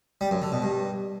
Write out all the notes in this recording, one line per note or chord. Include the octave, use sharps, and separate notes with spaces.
G3
F#2
D3
B2
G2